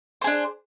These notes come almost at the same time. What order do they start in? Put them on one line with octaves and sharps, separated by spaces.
C5 G#4 D4